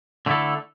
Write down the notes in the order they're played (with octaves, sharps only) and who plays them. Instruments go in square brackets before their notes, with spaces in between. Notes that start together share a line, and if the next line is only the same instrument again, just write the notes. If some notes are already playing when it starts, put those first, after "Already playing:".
[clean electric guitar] D3 A3 E4 A4